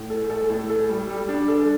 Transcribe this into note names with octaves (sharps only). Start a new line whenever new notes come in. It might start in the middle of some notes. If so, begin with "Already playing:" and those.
Already playing: A2
A4
A4
A2
A4
G3
G3
D4
A4